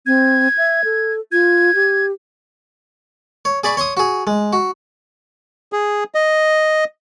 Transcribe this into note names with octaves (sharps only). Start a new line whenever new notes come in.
C4 G#6
E5
A4
F4 G#6
G4
C#5
G#4 D5 B5 C#6
C#5 C6 C#6 D#6
F#4 G#4
G#3
F#4
G#4
D#5